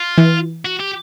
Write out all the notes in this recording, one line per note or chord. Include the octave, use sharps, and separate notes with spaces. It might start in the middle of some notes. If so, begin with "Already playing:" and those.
Already playing: F4
E3
F#4
G4